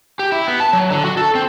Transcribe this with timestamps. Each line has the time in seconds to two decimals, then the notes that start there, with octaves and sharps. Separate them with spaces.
0.19 G4
0.32 E4
0.48 B3
0.60 A5
0.73 F#3
0.91 D3
1.05 F#4
1.17 A4
1.35 C4